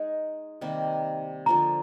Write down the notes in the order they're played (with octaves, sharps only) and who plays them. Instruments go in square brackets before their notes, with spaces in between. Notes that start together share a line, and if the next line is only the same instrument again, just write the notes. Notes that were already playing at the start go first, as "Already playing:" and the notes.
Already playing: [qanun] G#3 D#4 G#4
C3 D#3 G3 A#3
[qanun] D3 F3 A#3 [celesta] A#5